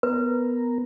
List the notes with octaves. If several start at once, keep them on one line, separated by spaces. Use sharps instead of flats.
B3 A#4 B4